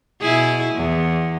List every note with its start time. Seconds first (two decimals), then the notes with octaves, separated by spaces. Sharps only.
0.21 B2 E4 G#4
0.75 E2